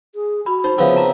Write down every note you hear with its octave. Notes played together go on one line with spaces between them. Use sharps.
G#4
F#4 B5
D#4 C5 B5
C#3 F3 B3 C4 E5 F5 D6
A5 A#5 D6